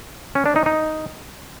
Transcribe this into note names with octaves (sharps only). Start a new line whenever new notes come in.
C#4
D4
D#4
D#4